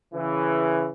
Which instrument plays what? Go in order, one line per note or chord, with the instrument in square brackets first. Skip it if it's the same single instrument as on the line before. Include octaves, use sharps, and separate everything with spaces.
[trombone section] C#3 E3